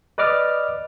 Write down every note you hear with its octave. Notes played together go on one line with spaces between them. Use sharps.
B4 D5 D#5 D6 F6